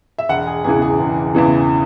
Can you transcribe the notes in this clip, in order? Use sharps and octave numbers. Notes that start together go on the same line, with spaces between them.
E5
E1 F#5
G#4
E2 C#3 E3 G#4
G#4
E1
E2 C#3 E3